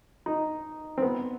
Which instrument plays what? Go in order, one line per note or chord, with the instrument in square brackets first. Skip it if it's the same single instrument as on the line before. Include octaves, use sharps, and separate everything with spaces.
[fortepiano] D#4
C4
B3